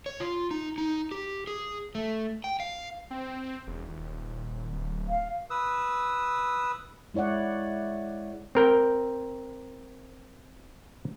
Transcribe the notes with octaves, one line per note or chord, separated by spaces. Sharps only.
C#5
F4
D#4
D#4
G4
G#4
A3
G5
F5
C4
E1
D#1
D1
F5
B4 D#6 E6
G#3 E4 C#5 D5 F#5
C4 A#4 G5